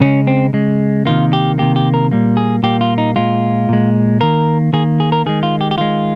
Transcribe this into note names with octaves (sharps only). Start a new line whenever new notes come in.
C#3 G#3 C#4
C4
C#3 G#3
C3 D#3 A#3 F4
G4
C3 D#3 A#3 G4
G4
A#4
A#2 G3 A#3
G#4
A#2 G3 A#3 G4
F4
D#4
A#2 G#3 F4
A#2 G#3
D#3 A#3 A#4
D#3 A#3 G#4
G#4
A#4
D#3 G#3 G#4
F4
G4
G4
D#3 G#3 F4